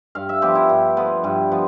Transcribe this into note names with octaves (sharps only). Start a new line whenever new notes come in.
G2 F5
E5
F3 B3 G4
E4
G2
F3 B3
G2
F3 B3